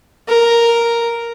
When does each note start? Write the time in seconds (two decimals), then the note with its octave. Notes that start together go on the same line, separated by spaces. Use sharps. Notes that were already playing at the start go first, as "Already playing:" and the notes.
0.28 A#4